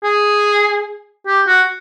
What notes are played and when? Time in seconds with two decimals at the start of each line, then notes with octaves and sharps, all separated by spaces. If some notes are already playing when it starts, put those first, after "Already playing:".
0.04 G#4
1.27 G4
1.47 F#4